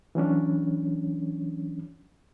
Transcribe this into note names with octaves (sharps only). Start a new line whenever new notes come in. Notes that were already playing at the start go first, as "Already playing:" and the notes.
E3 F#3 C#4 D4